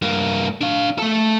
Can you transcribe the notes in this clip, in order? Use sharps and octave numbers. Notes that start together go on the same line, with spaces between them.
G2 A#3
D4 F5
A3 A4